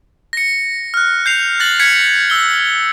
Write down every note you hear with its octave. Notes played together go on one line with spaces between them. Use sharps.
A#6 C#7
F6 F#6
G6 C7 F7
F#6 A6 A#6 F#7
G#6 B6 C#7
E6 G7